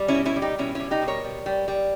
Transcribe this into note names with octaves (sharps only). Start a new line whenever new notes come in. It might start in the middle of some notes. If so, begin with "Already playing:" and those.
Already playing: G3
C#4 E4
B2
C#4 E4
G3
D#4 G4
B2 C#4 E4
G3 C#4 E4
D#4 G4
B2
A#4 C#5
G3
G3
G3